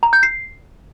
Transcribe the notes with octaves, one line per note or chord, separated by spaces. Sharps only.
A#5
G6
C7